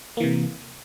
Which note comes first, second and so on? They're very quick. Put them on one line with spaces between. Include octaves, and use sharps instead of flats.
A#3 E3 C3